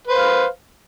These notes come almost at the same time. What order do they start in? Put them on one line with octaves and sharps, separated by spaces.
B4 C5 F5